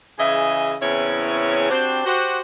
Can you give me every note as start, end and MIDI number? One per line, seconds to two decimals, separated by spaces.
0.19 0.74 49
0.19 0.74 52
0.19 0.74 68
0.19 0.74 75
0.19 0.74 76
0.81 1.70 40
0.81 1.70 49
0.81 1.70 60
0.81 1.70 61
0.81 1.70 64
0.81 1.70 73
1.70 2.02 60
1.70 2.02 62
1.70 2.02 66
1.70 2.02 67
1.70 2.02 72
2.06 2.40 66
2.06 2.40 67
2.06 2.40 72